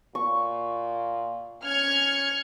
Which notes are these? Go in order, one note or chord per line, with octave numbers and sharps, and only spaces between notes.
A#2 C#6
C#4 F6 G#6 C#7